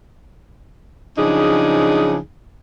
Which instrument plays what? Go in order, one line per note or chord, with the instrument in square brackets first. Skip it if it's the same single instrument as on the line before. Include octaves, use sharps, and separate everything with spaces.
[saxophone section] C#3 F3 F#3 D4 D#4 G#4